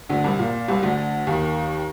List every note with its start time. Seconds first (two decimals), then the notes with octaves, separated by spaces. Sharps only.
0.09 D2 D3
0.24 C2 C3
0.39 A#2
0.68 C2 C3
0.83 D2 D3
1.27 D#2 D#3